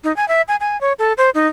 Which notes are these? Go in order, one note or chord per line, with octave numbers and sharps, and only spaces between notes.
D#4
G#5
E5
G#5
G#5
C#5
A4
C5
D#4